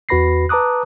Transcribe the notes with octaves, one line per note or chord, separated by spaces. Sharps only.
E2 F#4 B4 B5 A#6 C7
B4 A5 A#5 D6 D#6 F#6